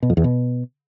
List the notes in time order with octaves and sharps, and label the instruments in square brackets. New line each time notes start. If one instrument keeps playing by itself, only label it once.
[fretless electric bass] B2
F2
E2
B2